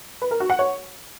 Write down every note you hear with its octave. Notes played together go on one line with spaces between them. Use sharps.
B4
A#4
F#4
F#5
C#5